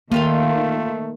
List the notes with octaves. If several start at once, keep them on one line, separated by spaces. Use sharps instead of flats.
D#3 A3 A#3 F4 G4 F5